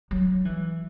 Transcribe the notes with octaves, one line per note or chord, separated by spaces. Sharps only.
F#3
E3